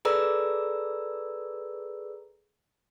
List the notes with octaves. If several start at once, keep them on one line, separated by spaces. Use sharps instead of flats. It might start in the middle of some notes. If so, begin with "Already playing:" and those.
G#4 A4 B4 D5 A#5 E6